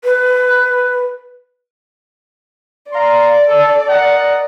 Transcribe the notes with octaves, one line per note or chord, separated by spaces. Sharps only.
B4
D5 F5 A#5 C6
A4
A#4 D#5 F#5